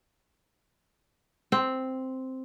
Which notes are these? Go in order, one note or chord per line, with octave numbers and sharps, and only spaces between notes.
C4